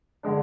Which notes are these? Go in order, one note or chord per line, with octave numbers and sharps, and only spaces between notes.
D3 G#3 D4